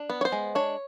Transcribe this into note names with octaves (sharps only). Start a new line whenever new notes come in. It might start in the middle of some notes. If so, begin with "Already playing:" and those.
Already playing: D4
B3
C#5
C5
G#3
D4 C#5